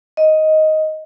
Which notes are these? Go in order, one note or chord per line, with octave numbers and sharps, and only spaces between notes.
D#5